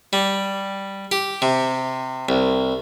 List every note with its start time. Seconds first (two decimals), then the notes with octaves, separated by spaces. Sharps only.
0.13 G3
1.12 G4
1.42 C3
2.29 C2